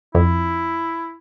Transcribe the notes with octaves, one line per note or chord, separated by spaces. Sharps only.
F2 E4